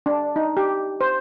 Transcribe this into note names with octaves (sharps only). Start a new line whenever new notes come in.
D4
D#4
G4
C5